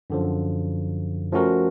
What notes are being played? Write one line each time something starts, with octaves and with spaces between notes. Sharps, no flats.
F#2 D3 F3
F3 A3 C#4 F#4 A#4